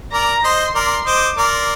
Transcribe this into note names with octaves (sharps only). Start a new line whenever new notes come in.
A#4 D5 A#5
C5 D#5 C6
A#4 D5
C5 D#5 D6
A#4 D5 C6